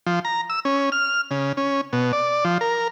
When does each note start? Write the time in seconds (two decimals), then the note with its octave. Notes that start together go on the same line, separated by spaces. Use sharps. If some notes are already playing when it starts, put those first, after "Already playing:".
0.06 F3
0.25 A#5
0.50 E6
0.65 C#4
0.92 F6
1.31 C#3
1.57 C#4
1.93 B2
2.13 D5
2.45 F3
2.61 A#4